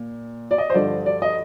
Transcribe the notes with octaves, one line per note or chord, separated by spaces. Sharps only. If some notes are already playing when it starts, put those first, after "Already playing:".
Already playing: A#2
D5
D#5
C5
G2 D3 F3 D5
D5
D#5